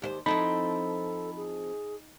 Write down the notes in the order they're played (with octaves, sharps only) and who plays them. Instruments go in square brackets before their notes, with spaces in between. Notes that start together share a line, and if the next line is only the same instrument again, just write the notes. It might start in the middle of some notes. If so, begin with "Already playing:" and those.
[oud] D#2 E4 C5 [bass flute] G4
[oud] F3 C4 E4 [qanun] D#4 [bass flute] A4 [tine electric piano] B5
[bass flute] G#4